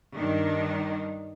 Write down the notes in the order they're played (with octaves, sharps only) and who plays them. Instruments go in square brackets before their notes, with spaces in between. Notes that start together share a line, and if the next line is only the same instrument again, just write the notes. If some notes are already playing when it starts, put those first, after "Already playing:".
[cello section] G2 D#3 D4 D#4